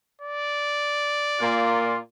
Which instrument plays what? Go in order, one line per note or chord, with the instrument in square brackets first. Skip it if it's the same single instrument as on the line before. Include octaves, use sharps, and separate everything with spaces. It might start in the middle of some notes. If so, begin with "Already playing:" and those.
[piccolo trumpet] D5
[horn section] A#2 A#3 F4